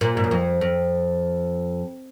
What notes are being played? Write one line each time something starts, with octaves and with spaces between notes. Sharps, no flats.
A#2
G#2
F#2
F2
F2